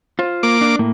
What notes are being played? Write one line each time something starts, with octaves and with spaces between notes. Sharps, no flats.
F4 C5
A#3 D6
D4
A2 A#3